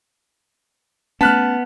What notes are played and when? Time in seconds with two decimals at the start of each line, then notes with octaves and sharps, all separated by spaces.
1.21 A3 B3 C#4 A5 F6 F#6 B6